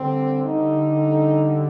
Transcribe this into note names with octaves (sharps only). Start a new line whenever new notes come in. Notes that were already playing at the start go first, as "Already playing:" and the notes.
Already playing: D3 G3 C4
D#4